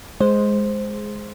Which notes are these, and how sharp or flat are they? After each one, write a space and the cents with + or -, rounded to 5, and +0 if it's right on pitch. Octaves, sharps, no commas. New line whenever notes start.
G#3 +5 C5 +0